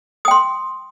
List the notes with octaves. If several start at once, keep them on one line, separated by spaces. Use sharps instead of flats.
G5 C6 D#6